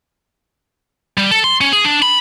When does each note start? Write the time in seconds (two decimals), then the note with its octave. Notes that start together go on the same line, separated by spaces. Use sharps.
1.18 G3
1.31 A4
1.44 C6
1.61 C#4
1.73 G#4
1.85 D4
2.02 B5